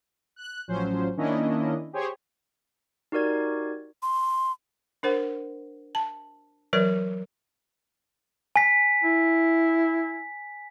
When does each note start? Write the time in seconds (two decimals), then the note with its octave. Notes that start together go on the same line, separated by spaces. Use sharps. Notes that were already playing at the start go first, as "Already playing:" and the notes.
0.36 F#6
0.68 A1 F3 F#3 C#4 C5
1.17 D#3 A#3 C#4 D4 E4 D#5
1.93 G4 G#4 C5 C#5
3.12 D#4 F#4 G4 A#4 D5 G#6
4.02 C6
5.03 D4 A#4 C5 F#5
5.95 A5
6.73 E3 F#3 A#4 B4 D5
8.56 G#5 B6
9.04 E4